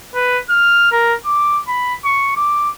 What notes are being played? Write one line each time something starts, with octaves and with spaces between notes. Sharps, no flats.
B4
F6
A#4
D6
B5
C#6
D6